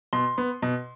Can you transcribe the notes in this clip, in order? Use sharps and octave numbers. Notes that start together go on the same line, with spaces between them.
B2 C6
B3
B2